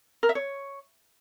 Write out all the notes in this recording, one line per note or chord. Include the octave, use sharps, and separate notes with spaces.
A#4
E5
C#5